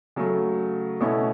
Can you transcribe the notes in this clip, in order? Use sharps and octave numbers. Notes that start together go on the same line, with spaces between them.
C#3 F#3 A3
B2 A3 C#4 E4